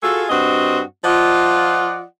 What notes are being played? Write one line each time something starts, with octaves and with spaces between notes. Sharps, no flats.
F4 F#4 G#4 A4
G2 C4 F#4 D#5 F#5
F3 F4 D5 D#5 F#5